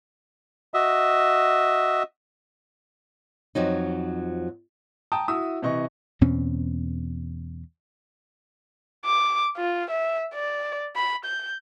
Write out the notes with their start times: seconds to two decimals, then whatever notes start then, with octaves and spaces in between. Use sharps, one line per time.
0.74 F#4 D#5 E5
3.55 F2 F3 F#3 D#4
5.12 G5 A5 A#5 D#6
5.28 E4 F#4 E5 D#6 E6
5.62 C3 E3 D#5 C#6
6.21 E2 B2 C4 C#4
9.05 D6
9.57 F4
9.90 E5
10.34 D5
10.96 B5
11.25 G6